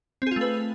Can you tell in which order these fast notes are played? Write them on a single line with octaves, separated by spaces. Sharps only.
C4 G#4 F4 A3 B4